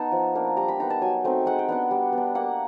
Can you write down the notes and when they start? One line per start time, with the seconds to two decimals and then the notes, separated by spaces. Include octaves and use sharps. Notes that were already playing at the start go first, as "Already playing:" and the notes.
Already playing: B3 D#4 A5
0.12 F3
0.35 A#3 D4
0.56 G3 A#5
0.68 B5
0.80 B3 D#4 A#5
0.90 A5
1.02 F#3 G#5
1.24 A3 C4 D#4
1.46 G#3 F#5
1.59 G5
1.68 B3 D4 F#5
1.91 G3
2.13 B3 D4
2.35 A#3 F#5